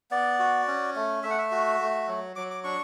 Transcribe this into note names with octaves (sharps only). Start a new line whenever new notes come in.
B3 D5
F#4
C#4
A3
A3 E5
F#5
E5
F#4
A3
F#3
F#3 D6
D6
D4 C#6